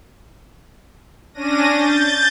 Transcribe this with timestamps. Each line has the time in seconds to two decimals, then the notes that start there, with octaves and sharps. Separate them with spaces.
1.34 C#4 D4 A#6 D#7
1.67 G6 A6